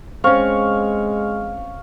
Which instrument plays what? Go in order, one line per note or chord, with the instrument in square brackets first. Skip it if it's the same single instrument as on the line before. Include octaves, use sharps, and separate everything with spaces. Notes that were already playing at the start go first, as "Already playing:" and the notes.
[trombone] G#3 [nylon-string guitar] C4 C#4 [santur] F5 C#6